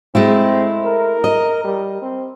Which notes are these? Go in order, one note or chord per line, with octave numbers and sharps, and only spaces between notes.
G#3 A3 C4 E4
A#4
D#5
G3
C4